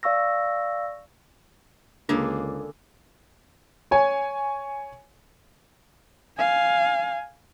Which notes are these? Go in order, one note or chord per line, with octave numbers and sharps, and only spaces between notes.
D5 F5 C#6 E6 A#6
C#2 D3 A#3 D4 G#4
C#5 G#5
F5 G#5